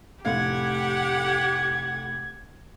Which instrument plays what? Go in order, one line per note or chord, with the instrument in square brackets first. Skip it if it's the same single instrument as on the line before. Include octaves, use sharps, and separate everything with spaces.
[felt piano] F1 A2 F5 [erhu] G4 [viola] F#5 [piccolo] G#6